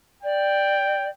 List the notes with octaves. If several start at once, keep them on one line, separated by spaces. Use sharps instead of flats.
D5 G5